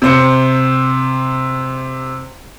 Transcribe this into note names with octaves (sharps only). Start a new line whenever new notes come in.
C3 C5 C#7